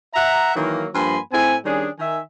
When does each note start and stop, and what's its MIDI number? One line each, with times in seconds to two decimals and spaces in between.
0.15 0.54 76
0.15 0.54 78
0.15 0.54 82
0.55 0.86 51
0.55 0.86 52
0.55 0.86 54
0.55 0.86 58
0.94 1.19 43
0.94 1.19 53
0.94 1.19 58
0.94 1.19 80
0.94 1.19 83
0.94 1.19 84
1.32 1.56 45
1.32 1.56 60
1.32 1.56 64
1.32 1.56 80
1.65 1.88 51
1.65 1.88 55
1.65 1.88 61
1.65 1.88 62
1.65 1.88 68
1.99 2.19 51
1.99 2.19 76
1.99 2.19 80